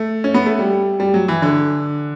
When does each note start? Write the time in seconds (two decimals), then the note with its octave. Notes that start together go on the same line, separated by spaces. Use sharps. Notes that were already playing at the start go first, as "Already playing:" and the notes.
Already playing: A3
0.24 C#4
0.34 B3
0.46 A3
0.59 G3
1.00 G3
1.14 F#3
1.28 E3
1.42 D3